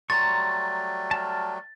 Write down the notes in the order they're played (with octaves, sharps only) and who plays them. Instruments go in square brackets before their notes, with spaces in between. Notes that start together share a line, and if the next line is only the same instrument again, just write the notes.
[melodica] F#3 G3 A3 [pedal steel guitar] A#5 C6 C#6 [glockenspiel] A6
[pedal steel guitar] A5 F6